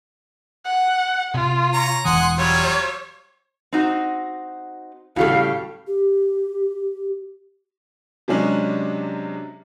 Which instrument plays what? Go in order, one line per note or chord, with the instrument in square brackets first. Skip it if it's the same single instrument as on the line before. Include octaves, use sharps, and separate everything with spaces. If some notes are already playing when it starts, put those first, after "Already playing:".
[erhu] F#5
[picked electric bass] C3 [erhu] F4
[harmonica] C#5 A#5
[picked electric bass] E1 E3 [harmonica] F#5 G#5 D#6 [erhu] C6
[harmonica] F#3 G3 F4 [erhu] C#5
[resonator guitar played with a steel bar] C4 D#4 F#4
[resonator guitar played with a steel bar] A2 C#3 G3 [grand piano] F#4 A4 [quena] F5
[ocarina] G4
[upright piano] C3 F#3 G#3 C#4 D4